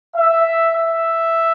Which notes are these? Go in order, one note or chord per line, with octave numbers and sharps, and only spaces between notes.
E5
E5